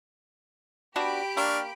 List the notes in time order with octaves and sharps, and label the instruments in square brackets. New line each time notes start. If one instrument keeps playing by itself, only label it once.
[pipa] B3 D4 F#4 [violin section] G4 D7 [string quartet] G5 B5
[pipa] A#3 [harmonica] D4 C#6 F6